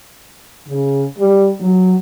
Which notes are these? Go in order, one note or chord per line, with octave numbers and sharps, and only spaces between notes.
C#3
G3
F#3